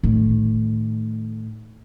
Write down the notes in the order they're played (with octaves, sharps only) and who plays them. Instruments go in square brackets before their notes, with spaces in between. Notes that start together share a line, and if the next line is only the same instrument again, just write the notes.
[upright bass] A2 D#3